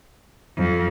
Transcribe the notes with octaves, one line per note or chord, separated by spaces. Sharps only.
F2